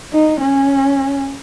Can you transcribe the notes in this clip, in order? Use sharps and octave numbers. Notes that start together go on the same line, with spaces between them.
D#4
C#4